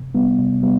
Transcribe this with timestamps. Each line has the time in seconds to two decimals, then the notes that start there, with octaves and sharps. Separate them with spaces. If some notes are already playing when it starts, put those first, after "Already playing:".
Already playing: C3
0.15 G3 B3
0.39 C3
0.63 G3 B3